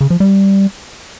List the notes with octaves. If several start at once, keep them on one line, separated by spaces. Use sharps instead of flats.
C#3
F3
G3